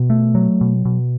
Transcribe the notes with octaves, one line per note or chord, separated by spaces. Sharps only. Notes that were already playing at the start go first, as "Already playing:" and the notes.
Already playing: B2
A3
F#3
B2
B2